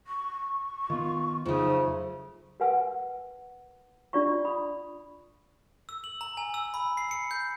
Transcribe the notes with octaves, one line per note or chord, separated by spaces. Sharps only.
C#6
D#3 B3 F4
F2 C#3 F3 F#3 A3 D#4
A#4 B4 F#5 G#5 E6
D4 F4 D5 D#5 C#6
B5 D#6
E6
F#7
A#5
G#5
E6
B5
C7
C#7
G6